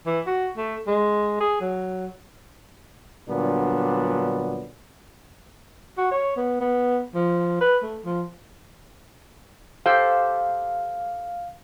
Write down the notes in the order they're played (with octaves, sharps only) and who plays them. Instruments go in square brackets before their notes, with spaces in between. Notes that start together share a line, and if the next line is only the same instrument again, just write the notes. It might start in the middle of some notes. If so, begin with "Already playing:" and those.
[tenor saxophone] E3
F#4
A3
G#3
G#4
F#3
[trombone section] A#2 D3 F#3 G3 B3 D4
[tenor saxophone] F#4
C#5
B3
B3
F3
B4
A3
F3
[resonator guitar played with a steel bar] G4 A4 C5 [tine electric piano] F5